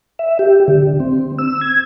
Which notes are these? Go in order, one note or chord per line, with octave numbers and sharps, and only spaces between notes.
E5
G4
D3
C4
E6
G#6